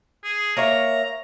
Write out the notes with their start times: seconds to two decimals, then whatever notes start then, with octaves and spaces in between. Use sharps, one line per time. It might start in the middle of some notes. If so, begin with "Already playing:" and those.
0.24 G#4
0.57 A#3 C#5 E5 A#5